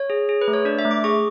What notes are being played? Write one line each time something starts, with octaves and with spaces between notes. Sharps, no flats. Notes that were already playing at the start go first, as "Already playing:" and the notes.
Already playing: C#5
G#4
G#4
B4
A3
C#5
D4 D5
E5
A3
D6
G#4 C#6